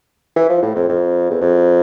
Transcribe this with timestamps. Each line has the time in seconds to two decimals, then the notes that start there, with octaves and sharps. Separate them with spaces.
0.36 E3
0.49 F3
0.63 A2
0.76 F2
0.89 F2
1.30 E2
1.41 F2